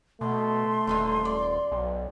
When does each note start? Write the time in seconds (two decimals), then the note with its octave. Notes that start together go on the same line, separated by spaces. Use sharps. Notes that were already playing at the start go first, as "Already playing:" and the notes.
0.21 B2 A3 C6
0.87 D#1 D3 D#4 F4
1.25 D5
1.72 B1